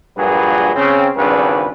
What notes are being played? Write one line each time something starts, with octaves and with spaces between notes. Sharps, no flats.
A#1 G2 A#2 F#3 G#4 B4
C#3 C4 C#4
G#1 C#2 G2 C#4 D4 B4